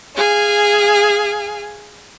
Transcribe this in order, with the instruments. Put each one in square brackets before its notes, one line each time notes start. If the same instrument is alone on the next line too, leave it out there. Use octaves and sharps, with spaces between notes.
[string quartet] G#4 F5 G#5